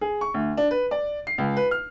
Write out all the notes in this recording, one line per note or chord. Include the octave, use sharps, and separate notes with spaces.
G#4
C#6
D2
D4
B4
D5
C7
C#2
B4
F6